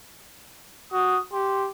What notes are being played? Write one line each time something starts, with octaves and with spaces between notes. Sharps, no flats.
F#4 D#6
G4 C6